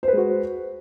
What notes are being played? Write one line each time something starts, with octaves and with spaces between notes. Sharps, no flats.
G#3 F#4 B4 C5